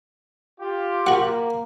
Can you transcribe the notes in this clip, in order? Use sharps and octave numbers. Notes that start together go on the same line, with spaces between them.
F4 G4
A#3 F#4 F#5